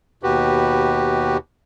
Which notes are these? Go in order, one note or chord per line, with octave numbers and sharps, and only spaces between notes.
D#2 B2 F#4 G4 B4